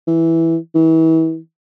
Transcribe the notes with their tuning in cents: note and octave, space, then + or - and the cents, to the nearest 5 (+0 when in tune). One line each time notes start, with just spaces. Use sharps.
E3 -5
E3 -35